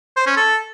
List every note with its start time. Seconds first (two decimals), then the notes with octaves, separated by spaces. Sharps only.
0.16 C5
0.26 C#4
0.37 A4